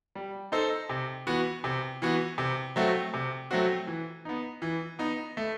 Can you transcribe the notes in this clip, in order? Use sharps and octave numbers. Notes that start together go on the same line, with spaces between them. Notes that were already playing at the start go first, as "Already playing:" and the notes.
G3
D#4 A4 C5 D#5
C3
E3 B3 F#4
C3
E3 B3 F#4
C3
F#3 A3 C4 F#4
C3
F#3 A3 C4 F#4
E3
B3 D#4
E3
B3 D#4
A3